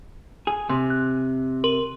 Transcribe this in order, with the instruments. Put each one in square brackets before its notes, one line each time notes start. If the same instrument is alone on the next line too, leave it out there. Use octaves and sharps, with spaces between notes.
[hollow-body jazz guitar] G#4
C3
[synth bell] F#6
A#4 C6 F#7